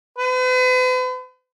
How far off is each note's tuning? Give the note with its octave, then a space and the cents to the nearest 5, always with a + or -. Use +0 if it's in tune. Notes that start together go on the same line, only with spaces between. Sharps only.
B4 +45